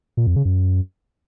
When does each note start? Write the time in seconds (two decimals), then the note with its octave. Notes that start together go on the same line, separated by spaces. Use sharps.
0.17 A#2
0.27 F2
0.36 C#3
0.45 F#2